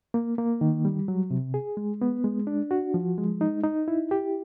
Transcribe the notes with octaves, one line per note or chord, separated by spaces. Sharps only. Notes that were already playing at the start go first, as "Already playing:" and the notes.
A#3
A#3
D#3
G3
F#3
C3
G#4
G#3
B3
G#3
D4
F#4
F3
G#3
D#4
D#4
E4
G4